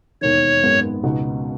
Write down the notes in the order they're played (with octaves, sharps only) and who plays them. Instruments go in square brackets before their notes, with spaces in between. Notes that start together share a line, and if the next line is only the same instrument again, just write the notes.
[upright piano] E1 D#2 D#3 [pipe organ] C#5
[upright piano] G#1 F#2 D#3 G#3 B3
C#2 B2 G#3 D#4 F#4